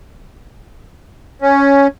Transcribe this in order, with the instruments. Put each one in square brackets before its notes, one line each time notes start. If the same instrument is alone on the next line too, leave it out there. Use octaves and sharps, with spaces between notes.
[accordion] C#4